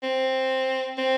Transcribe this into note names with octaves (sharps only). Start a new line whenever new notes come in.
C4
C4